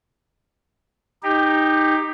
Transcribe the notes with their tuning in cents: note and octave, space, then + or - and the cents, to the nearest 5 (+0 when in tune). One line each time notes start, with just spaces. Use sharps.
D#4 +0 G4 +15